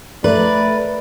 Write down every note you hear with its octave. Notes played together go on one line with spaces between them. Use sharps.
A3 A#4 B4 D5